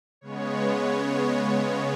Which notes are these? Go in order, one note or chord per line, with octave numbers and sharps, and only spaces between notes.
C#3 G#3 B3 C#5
C#3 G#3 B3